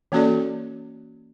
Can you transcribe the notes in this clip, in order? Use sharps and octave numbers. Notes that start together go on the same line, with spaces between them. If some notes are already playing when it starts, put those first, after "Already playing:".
E3 A#3 C#4 F#4 A4 D5